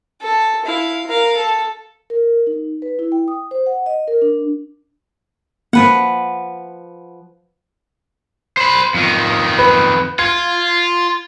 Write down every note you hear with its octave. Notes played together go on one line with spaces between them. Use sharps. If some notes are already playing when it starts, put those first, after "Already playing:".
A4
E4 F5
A#4 F5
A4
A#4
D#4
B4
E4
G5
D#6
C5
F#5
D#5
A#4
D4
F3 A#3 B4 F#5
C5 B5
F2 D#3
B4
F4 G#6